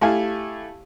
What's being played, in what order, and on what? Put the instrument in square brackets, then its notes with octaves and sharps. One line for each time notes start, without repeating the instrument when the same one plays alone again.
[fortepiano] A3 E4 G4 F5 G#5